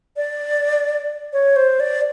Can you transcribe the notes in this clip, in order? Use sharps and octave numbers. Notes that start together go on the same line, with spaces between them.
D5
C#5
C5
D5